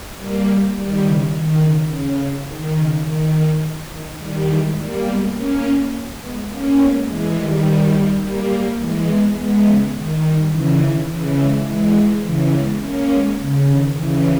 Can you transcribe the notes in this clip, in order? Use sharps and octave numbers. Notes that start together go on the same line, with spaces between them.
G3 A#3
D#3 G3
C#3 E3
D#3
C#3
C#3
D#3
C#3
D#3
D#3
D#3
D#3 G3
E3 G#3
G3 A#3
G#3 B3
A#3 C#4
G#3 B3
A#3 C#4
G#3 B3
E3 G#3
D#3 G3
G3 A#3
G3 A#3
G3 A#3
E3 G#3
G#3 B3
G#3 B3
C#3 E3
D#3
D#3 G3
C#3 E3
D#3
C#3 E3
E3 G#3
E3 G#3
C#3 E3
G#3 B3
A#3 C#4
G#3 B3
C#3
D#3
C#3 E3